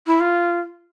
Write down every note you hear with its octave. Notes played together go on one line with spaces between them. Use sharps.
E4
F4